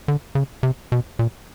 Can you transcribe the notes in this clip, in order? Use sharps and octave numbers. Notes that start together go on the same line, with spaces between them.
D3
C#3
C3
B2
A#2